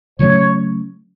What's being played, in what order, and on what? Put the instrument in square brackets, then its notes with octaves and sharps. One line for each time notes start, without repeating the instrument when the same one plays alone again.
[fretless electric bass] C#3 F#3 A3 C#4 [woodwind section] C#5